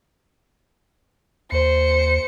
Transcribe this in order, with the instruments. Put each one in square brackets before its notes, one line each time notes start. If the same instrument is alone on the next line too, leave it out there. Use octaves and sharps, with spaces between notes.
[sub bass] D#2 [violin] C5 C#7